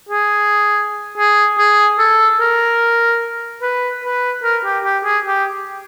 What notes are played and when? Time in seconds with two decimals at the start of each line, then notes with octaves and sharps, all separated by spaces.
0.09 G#4
1.18 G#4
1.58 G#4
1.99 A4
2.40 A#4
3.62 B4
4.04 B4
4.43 A#4
4.65 G4
4.84 G4
5.05 G#4
5.26 G4